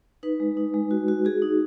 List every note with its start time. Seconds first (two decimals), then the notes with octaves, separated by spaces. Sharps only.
0.23 D#4 B4
0.40 G#3
0.57 D#4
0.74 G#3
0.91 F#4
1.08 F#4
1.25 F#4 G#4
1.42 D#4